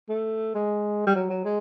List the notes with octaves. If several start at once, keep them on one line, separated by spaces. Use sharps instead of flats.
A3
G#3
G3
F#3
F#3
G#3